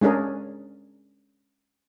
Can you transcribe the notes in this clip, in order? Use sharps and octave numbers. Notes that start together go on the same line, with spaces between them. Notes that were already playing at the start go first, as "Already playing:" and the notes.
G#3 C#4 D4 G#4 A#4